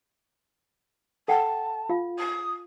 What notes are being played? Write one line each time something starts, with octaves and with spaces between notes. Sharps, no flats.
A4 F#5 G5 A5
F4 F5
D#6